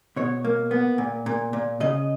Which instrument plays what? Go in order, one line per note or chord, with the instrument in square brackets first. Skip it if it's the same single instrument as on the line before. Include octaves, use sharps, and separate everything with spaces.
[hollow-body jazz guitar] B2 C#5
A#3
B3
A#2
A#2
A#2
C#3 D#5